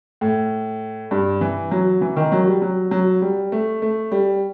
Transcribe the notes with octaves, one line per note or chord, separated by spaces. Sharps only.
A2
G2
E3
F#3
E3
D#3
F#3
G3
F#3
F#3
G3
A3
A3
G3